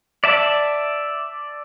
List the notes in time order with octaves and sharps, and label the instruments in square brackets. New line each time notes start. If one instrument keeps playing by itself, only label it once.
[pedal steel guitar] D5 E5 A5